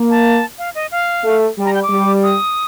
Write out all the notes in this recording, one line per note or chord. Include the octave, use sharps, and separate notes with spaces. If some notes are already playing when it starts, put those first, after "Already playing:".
Already playing: A#3
A5
F5
D#5
F5
A3
G3
A#5
G5
D6
G3
D#6